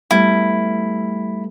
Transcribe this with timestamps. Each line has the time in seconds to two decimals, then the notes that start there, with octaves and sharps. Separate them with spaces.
0.11 G3 A3 B3 E4